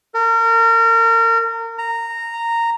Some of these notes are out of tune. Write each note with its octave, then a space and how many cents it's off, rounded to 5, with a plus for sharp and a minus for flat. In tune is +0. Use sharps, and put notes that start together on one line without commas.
A#4 -30
A#5 -10